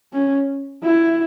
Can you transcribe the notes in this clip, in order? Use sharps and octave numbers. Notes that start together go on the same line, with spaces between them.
C#4
E4